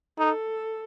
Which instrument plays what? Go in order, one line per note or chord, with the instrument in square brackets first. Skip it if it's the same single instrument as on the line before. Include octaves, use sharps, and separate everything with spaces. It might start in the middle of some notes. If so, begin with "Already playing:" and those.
[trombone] D#4 [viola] A4